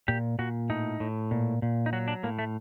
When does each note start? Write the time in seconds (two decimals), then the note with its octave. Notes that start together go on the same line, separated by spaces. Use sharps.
0.08 A#2 G4
0.39 A#2 F#4
0.70 A2 D#4
1.00 A2
1.31 A#2
1.62 A#2
1.86 D#4
1.93 F#3 F#4
2.08 D4
2.23 A2 A#3
2.39 A3